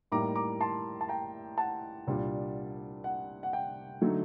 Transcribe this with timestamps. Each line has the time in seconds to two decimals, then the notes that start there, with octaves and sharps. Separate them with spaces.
0.12 A2 G3 A#3 D#4 A#5 D6
0.35 A#5 D6
0.61 A5 C6
1.01 A5
1.09 G5 A#5
1.58 F#5 A5
2.07 C2 A#2 G3 D4
3.04 F#5
3.43 F#5
3.53 G5
4.01 D3 F#3 A3 D#4